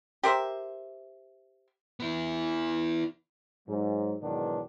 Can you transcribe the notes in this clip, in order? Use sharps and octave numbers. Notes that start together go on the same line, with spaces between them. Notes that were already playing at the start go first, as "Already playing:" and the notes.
G4 A#4 C5 E5
B3 E4
G#2 F#3
E2 G#2 B2 D#3 F#3 D4